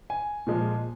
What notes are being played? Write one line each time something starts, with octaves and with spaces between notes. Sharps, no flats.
G#5
A#2 F3 G#3